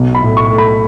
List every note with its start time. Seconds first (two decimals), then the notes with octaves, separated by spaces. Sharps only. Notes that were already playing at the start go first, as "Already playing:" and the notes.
Already playing: B1
0.15 B5
0.22 A2
0.37 C#6
0.51 A3
0.58 B5